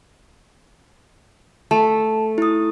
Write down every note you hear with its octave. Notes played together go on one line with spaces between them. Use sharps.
A3 A5
E4 D#6